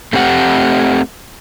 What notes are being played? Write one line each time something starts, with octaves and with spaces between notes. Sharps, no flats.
A3 C4 G4 F#5